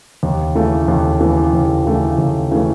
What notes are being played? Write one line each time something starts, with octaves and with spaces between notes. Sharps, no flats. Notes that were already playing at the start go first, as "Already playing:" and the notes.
D#2
C#3 E3 A3
D#2
C#3 E3 A3
D#2
C#3 E3 A3
D#2
C#3 E3 A3